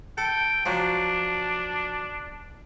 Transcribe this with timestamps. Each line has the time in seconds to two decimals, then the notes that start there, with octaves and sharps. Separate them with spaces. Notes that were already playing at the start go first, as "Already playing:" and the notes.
0.18 A4 G5
0.66 F3 F#3 D4